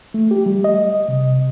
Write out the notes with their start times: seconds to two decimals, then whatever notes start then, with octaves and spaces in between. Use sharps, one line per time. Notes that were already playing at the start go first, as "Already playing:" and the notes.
0.14 A3
0.31 G4
0.46 G3
0.64 D#5
1.08 C3